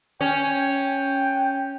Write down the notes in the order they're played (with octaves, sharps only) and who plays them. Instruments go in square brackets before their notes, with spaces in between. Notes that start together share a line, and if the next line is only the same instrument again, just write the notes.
[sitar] C#4 [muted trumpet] G5